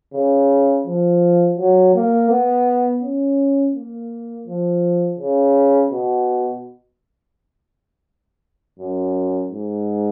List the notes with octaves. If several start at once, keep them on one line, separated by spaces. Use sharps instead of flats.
C#3
F3
F#3
A#3
B3
C#4
A#3
F3
C#3
B2
F#2
G#2